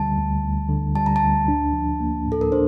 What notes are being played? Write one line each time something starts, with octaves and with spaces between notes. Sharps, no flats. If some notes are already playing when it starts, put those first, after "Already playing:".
Already playing: D2 D3 G3 A5
D2
D2
D3
G3 A5
A#5
A5
D2
D4
F3
A#3
A2
A4
A#4
D4 C5